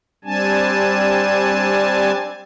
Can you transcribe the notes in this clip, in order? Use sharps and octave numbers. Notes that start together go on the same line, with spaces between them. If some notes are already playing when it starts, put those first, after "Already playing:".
G3 C4 D4 G#5 A5